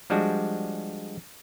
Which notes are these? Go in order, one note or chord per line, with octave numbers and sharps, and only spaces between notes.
F3 G3 G#3 D4 F#4